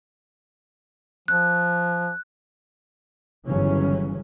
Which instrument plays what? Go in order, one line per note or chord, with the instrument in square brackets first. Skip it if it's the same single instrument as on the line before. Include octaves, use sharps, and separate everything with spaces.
[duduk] F3 [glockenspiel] F#6
[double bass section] G1 C#3 E3 F#3 C#4